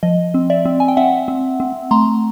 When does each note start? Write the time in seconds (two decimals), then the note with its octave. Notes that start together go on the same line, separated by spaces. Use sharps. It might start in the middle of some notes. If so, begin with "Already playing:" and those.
0.03 F3 D#5
0.34 C4
0.50 D5 E5
0.65 C4
0.80 G#5
0.88 G5
0.97 C4 E5 F#5
1.28 C4
1.60 C4
1.91 A3 A#5 C6